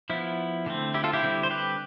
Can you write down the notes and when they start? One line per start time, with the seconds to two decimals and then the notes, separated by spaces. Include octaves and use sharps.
0.10 F3 B3 E4
0.66 D3 A3 C4
0.94 E4 G4
1.04 F4 A4
1.13 E4 G4
1.23 D3 G3 C4
1.43 C5
1.51 G4 B4